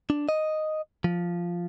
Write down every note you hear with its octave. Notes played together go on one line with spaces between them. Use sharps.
D4
D#5
F3